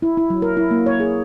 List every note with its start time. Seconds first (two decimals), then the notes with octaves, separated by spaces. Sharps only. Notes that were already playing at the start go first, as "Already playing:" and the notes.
0.02 E4
0.17 E4
0.30 F#3
0.42 A#4
0.57 E4
0.71 A#3
0.86 C#5
1.00 G#4